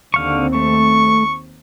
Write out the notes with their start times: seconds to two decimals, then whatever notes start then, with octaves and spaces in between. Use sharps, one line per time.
0.14 D#2 D3 C4 F5 C#6
0.55 A3 C#6